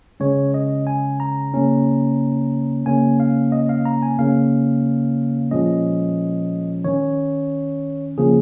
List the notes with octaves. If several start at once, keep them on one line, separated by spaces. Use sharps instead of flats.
C#3 G#3 C#4 C#5
D#5
G#5
A#5
C#3 A#3 C#4
C#3 A#3 C#4 G#5
F5
D#5
F5
A#5
G#5
C#3 A#3 C#4 F5
A#2 F3 G#3 C#4 D#5
D#3 C#4 C#5
C#3 F3 A#3 C#4 G#4